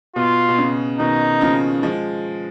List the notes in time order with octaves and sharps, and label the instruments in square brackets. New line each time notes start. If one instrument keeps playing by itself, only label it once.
[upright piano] B2 [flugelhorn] F4
[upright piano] B2
C#3
[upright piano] B2 D#3 [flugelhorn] D#4
[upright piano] C#3 F3
F3 G#3